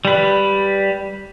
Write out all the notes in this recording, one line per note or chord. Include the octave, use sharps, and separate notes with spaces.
G3 B4